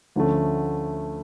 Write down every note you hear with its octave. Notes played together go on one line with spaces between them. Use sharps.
D2 D3 F3 A3 C#4